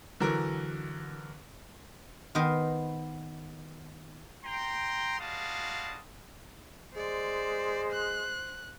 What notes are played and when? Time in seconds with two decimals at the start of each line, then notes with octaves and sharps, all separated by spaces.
0.20 D3 E3 F#3 A#4
2.35 D#3 B3 C5 D#5
4.44 G5 A#5 C6
5.19 G3 G#3 F#4 F5 A5 D#6
6.96 G#3 C5 D5
7.92 F#6